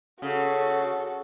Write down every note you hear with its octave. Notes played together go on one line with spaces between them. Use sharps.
C#3 F#4 A4